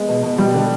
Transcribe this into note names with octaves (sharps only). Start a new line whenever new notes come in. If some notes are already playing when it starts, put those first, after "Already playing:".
Already playing: G#3 B3
B2
B2
G3
D3